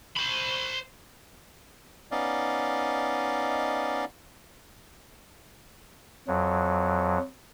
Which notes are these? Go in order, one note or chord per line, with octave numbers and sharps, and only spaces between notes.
C5 B5
B3 C#4 D#4 D5 D#5 F5
F2 F#3